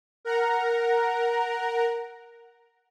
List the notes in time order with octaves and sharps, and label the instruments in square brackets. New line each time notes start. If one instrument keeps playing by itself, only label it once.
[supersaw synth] A#4 F#5 A#5